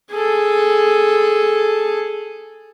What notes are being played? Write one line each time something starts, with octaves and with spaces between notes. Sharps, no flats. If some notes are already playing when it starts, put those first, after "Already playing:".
G#4 A4